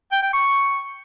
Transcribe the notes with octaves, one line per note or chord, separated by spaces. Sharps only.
G5
G5
C#6